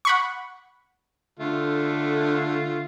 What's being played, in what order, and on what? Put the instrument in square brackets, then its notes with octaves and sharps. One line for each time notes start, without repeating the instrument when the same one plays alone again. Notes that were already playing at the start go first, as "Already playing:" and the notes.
[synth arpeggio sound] F#5 B5 C#6
[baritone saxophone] D3 [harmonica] A3 F4